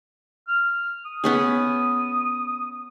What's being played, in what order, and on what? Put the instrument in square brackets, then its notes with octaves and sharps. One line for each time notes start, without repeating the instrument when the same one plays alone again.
[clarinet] F6
D#6
[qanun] B3 C#4 G#4